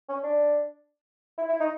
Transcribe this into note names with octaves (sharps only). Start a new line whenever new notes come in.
C#4
D4
E4
E4
D#4